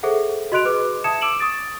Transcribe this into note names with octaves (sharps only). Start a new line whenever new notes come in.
G#4 A4 C5 E5 F#5
F#4 D#5 C6 F#6 D7 F7
G#4 B4 D6
E5 A5 D#6 G#6 C#7 E7
D6 E6 D7 E7 F#7
C#6 D#6 A6 D7